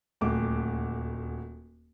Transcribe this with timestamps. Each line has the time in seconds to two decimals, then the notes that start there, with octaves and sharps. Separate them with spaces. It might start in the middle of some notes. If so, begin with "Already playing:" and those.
0.21 D#1 D2 D6